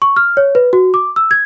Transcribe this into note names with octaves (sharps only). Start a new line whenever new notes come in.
C#6
F6
C#5
B4
F#4
D6
E6
G#6